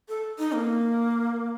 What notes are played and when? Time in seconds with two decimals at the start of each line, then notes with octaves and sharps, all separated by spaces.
0.09 A4
0.39 D#4
0.54 A#3